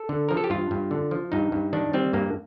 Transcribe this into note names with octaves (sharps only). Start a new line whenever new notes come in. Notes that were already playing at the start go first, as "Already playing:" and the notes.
Already playing: A4
D3
F3 A#4
A4
G4
G2 F4
G2
D3
F3
G2 D#4
G2
D#3 D4
G3 C4
G2 A#3